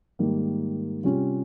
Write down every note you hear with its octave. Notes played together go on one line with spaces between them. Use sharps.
G#2 D#3 G3 A#3
C3 G3 C#4 F4